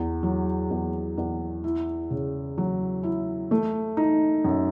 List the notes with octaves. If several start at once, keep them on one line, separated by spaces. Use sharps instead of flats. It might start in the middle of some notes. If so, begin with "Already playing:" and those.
Already playing: E2
F#3
E2
E2
E4
C#3
F#3
E4
A3
D#4
F#2